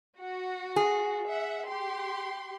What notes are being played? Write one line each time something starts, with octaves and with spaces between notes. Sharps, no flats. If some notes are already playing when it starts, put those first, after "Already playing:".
F#4
G#4
E5 F#5
G4 C6